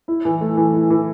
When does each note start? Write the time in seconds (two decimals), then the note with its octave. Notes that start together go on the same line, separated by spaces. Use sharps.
0.08 E4
0.25 E3
0.41 A3
0.57 E3
0.73 E4
0.90 E3